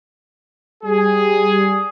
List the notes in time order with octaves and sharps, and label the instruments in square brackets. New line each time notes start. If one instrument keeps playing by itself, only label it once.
[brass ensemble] G3 G#4